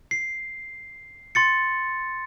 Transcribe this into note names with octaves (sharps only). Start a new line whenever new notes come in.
C7
C6 A6 C#7